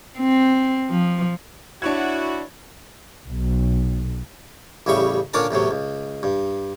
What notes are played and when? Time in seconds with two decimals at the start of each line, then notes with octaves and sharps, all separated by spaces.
0.18 C4
0.90 F3
1.82 D4 E4 F#4 C#5 G#6
3.28 B1
4.86 A1 A2 C#3 G3 E5 C#6
5.34 A#2 D3 C#4 D4 A#4 A5
5.51 E2 A2 C3 F#3
5.71 C#2
6.23 G2